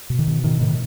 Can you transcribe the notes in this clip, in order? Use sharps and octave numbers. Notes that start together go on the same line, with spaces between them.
B2
D#3
B2
A2 D#3
A2 D#3